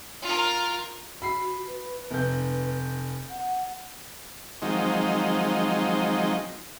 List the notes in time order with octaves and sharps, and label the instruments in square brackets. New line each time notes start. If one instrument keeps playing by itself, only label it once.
[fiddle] F4 A#4
[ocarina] F#4 [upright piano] B5 C7
[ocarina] B4
[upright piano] F1 G6
[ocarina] F#5
[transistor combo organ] D#3 F3 F#3 G#3 C4 D#4